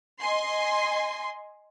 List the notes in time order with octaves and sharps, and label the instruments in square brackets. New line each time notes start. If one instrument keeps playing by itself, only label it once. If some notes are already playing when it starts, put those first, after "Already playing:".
[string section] D#5 G#5 C6